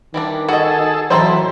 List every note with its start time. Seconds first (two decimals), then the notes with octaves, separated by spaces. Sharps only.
0.14 D#3 E3 G3 D4
0.49 F#4 G#4 A4 D#5 A5
1.10 D#3 E3 F#3 E4 A4 C5 A#5 C6